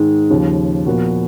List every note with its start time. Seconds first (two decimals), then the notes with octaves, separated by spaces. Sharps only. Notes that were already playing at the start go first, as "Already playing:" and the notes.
Already playing: G#2 D#3 G#3
0.30 D#2 C#3 F3
0.86 A#2 F3 B3 F#4 A#4